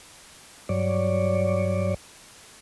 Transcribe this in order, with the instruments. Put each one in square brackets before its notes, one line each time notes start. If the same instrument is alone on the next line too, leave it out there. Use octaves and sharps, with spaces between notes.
[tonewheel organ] G2 F#3 C#5 D5